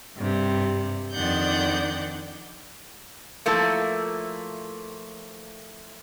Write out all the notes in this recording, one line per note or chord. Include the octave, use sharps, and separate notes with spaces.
G2 C3
F2 D#3 D4 D5 F#5 G6
F3 A3 A#3 E4